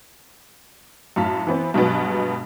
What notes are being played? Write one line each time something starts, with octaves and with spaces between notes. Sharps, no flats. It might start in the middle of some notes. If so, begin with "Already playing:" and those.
F#2 A2 F5 A5 B6
E3 B3 C4
G2 B2 F#3 G#3 B3